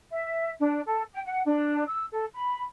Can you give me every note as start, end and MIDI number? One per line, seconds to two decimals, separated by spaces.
0.10 0.50 76
0.60 0.79 62
0.85 1.02 69
1.11 1.19 79
1.24 1.40 78
1.44 1.83 62
1.85 2.03 88
2.11 2.24 69
2.32 2.62 83